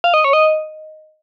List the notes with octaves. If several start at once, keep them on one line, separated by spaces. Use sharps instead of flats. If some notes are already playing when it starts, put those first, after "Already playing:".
F5
D#5
C#5
D#5